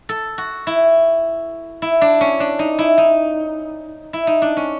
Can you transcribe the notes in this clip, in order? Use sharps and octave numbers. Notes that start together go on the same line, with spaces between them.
A4
F#4
E4
E4
D4
C#4
D4
D#4
E4
D#4
E4
D#4
D4
C#4